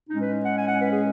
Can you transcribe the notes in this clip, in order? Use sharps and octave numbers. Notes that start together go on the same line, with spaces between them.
A2 G#3 C#4 D#4
B4
F#5
G#5
F#5
B4
G#4